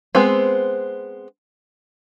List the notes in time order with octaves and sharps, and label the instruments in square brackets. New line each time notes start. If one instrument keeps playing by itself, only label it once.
[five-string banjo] G#3 B3 C4